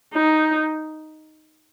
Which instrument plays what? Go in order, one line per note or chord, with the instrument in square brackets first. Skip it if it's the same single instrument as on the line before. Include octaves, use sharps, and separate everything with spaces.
[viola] D#4